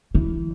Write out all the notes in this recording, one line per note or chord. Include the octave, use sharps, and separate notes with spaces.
E3